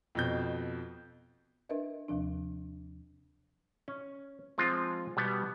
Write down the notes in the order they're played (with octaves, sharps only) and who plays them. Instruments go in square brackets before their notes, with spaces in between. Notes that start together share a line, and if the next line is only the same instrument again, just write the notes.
[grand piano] F2 B2 G6
[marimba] D4 A#4 B4 D#5 E5
D#2 C3 F3 D4
[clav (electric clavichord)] C#4
F3 G#3 C4 F4
B2 G3 B3